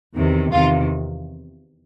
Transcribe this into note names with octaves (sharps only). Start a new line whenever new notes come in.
E2 C3 D#3
E2 C3 D#3 F4